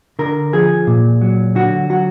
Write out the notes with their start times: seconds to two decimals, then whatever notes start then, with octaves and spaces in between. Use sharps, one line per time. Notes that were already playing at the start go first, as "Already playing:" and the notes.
0.19 D3 A#4
0.53 F3 G#4
0.87 A#2
1.21 F#3
1.55 D3 F#4
1.90 F#3 F#4